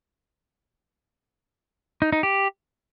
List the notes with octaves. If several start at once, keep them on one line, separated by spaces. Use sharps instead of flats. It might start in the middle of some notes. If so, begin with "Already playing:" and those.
D#4
D#4
G4